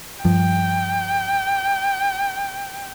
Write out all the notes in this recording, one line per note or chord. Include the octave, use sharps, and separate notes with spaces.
G2 F3 G5